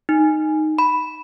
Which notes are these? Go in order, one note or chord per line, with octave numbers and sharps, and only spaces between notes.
D#4
B5